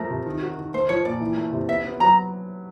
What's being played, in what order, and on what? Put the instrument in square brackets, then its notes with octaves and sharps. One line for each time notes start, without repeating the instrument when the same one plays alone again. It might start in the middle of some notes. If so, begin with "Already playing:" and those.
Already playing: [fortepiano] F3 A3 [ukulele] A#4
[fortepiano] C3
D#3
F#4
D#3
[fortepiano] A3 [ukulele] C5
[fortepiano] F3 [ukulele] C#5
[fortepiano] A#2 [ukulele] D5
[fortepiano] E3
A3
C3
[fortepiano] B3 [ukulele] E5
[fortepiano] B3
[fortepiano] F#3 [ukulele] A#5